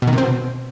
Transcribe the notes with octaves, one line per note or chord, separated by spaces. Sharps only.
B2
D#3
C3
C4
B2